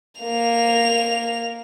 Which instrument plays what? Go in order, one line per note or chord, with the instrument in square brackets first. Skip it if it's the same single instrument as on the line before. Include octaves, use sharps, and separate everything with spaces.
[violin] A#3 F7